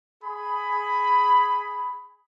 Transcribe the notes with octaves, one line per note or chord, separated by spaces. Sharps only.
G#4 B5